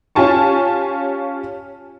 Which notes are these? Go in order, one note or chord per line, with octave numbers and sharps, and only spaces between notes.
C#4 F4 G4 G#5 A5 C#6